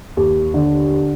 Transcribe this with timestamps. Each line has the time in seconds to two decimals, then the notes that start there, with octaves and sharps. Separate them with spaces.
0.17 D#2
0.54 D3